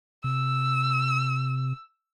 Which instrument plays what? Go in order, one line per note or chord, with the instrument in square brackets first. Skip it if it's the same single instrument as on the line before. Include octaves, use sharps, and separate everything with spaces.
[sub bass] C3 [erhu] E6